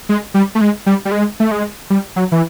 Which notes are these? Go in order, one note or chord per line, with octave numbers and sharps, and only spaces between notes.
G#3
G3
A3
G#3
G3
G3
G#3
A3
G#3
G3
F#3
E3